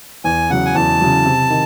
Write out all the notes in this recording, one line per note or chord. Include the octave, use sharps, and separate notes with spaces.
E2 G#5
C#3 F#3 F#5
G#5
E2 A5
C#3 F#3
C3
D#3